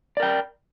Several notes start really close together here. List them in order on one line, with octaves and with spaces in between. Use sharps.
D5 A#4 G5